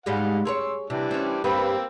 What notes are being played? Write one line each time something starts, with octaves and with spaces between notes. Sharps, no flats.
G#2 G3 G#3 F5 F#5
G#4 A#4 C#5 C6 E6
C3 E3 G3 D4
C4 C#4
G2 G3 A#3 C4 B4 E6